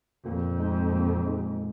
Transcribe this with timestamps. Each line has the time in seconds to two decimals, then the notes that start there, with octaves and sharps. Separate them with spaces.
0.25 F2 A#2
0.58 G#3 D#4
0.92 A#2
1.26 G#3 D#4